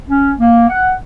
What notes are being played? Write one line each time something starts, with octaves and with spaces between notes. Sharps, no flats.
C#4
A#3
F#5